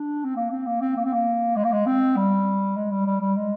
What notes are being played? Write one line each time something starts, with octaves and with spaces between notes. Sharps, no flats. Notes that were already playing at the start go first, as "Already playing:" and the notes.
Already playing: D4
C4
A#3
C4
A#3
C4
A#3
C4
A#3
G#3
A#3
G#3
C4
G3
G#3
G3
G3
G3
G#3